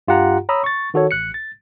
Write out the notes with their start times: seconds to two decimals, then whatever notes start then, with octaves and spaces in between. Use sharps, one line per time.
0.08 G2 F4 G4 F#5 A#5
0.49 C#5 A#5 B5 D#6 E6
0.64 C#6 A6
0.94 D#3 F#4 A4 C#5
1.11 A1 F#6 C#7
1.34 A6